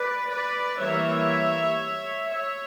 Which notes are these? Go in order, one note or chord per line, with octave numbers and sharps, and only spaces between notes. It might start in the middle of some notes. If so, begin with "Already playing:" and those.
Already playing: B4 D5
B4 D5
E3 G3 A#3 C#5 E5
C#5 E5